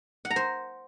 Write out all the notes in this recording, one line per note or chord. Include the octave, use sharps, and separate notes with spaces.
F#5
A#5
C5